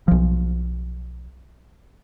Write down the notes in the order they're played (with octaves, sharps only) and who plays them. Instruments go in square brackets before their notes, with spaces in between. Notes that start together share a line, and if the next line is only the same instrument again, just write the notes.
[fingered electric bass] B1 F3